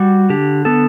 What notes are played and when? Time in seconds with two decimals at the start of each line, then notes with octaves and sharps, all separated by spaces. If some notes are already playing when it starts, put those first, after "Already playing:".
Already playing: G3 F#4
0.30 D3 G4
0.65 B3 A4